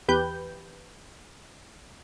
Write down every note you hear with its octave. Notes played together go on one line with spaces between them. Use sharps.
E2 G4 B4 G6